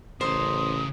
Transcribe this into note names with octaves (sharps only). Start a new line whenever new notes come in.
A1 C#3 A#4 C5 D#6